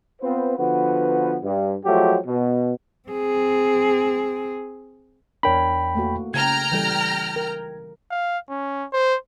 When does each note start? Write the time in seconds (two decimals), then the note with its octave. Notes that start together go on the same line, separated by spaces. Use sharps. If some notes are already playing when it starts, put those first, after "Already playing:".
0.22 B3 C4 F4 B4 C5
0.57 D3 F3 B3 F#4 B4
1.43 G2
1.85 F3 F#3 G#3 A3 F#4 G4
2.27 B2
3.09 C4 G#4
5.43 E2 D4 A#4 C#5 G5 B5
5.95 A3 A#3 F#4
6.34 C#3 G5 A#5 F6 G#6
6.72 E3 G3 A4
7.36 A#4
8.11 F5
8.50 C#4
8.93 C5